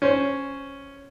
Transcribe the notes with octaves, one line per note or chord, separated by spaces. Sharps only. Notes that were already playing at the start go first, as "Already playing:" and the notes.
C#4 C5